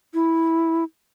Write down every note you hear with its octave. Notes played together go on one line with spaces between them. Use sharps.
E4